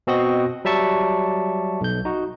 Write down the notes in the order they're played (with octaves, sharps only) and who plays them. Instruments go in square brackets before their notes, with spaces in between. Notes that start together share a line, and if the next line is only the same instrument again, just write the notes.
[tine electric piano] B2 C4 F#4 D#5 A#6
F#3 G3 E5 A5 C#6 C#7
B1 G6
D#4 F#4